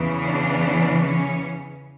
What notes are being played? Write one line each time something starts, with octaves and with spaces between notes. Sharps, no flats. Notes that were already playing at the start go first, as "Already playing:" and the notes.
Already playing: E2 C#3 E3
D4
C#4